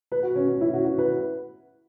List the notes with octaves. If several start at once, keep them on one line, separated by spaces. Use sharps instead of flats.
B4
F#4
C#4
C#4
E4
F#4
F#4
B4